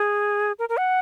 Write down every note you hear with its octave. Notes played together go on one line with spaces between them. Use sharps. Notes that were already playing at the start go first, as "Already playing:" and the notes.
Already playing: G#4
A#4
A#4
F#5